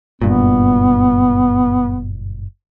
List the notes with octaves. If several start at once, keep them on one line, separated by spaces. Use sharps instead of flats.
F#1 G2 A#2 B3